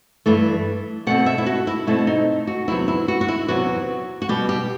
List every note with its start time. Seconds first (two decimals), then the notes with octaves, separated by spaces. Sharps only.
0.26 G2 E3 A3
1.07 B2 A3 C4 F#5
1.26 E5
1.38 E4
1.46 F#4
1.67 E4
1.87 B2 A3 C4 E4
2.07 D#4
2.47 F#4
2.68 E2 C3 F#3 B3 E4
2.88 E4
3.08 F#4
3.21 F#4
3.28 E4
3.48 E2 C3 F#3 B3 F#4
4.22 F#4
4.29 B2 G3 B3 G4
4.49 G4